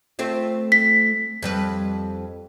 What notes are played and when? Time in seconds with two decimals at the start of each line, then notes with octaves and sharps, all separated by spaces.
0.19 A3 C4 F4
0.72 B6
1.42 F2 G3 B4